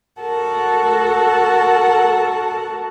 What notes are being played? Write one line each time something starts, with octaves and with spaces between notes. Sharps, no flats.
F#4 A4 A#4 F#5 A5